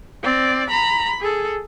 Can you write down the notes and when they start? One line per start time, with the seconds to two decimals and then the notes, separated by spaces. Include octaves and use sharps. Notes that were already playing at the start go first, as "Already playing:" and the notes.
0.23 C4 D5
0.70 A#5 B5
1.21 G#4 A4